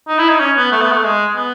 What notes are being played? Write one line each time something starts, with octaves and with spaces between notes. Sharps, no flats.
D#4
E4
D#4
C#4
B3
A3
B3
A3
G#3
B3